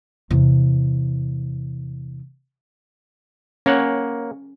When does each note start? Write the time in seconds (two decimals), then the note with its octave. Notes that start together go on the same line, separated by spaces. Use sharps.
0.30 E2 C3
3.66 A#3 C#4 C#5 F#5